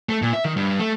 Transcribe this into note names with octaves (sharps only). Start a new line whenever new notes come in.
A3
A#2
E5
D#3
G2
A3